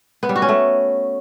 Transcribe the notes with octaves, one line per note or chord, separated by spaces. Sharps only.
B3
G3
F#4
C#4
A3